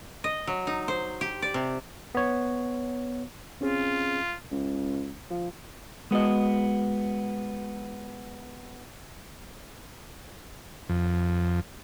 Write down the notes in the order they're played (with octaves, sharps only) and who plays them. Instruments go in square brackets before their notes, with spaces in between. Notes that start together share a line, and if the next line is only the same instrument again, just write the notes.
[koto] D#5
F#3
D#4
C5
G4
D5
C3
[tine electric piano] B3 C#5
[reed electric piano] C4 C#4 G#4 [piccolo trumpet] F4
[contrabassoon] C#2
F3
[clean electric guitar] G#3 B3 F#4 D#5
[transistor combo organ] F2